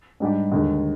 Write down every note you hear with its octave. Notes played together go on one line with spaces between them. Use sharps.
G#2 G3 D4 G4
D#2 D3 G#3